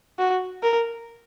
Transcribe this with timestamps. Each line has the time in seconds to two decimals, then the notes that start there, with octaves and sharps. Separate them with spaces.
0.19 F#4
0.62 A#4